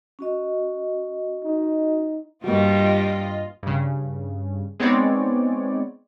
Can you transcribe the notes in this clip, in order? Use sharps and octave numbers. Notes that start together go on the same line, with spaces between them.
C#4 F#4 D#5
D#4
G2 G3 A#3 F4 F#4 D#5
G2 C#3
G#3 B3 C4 D#4 C#5 D5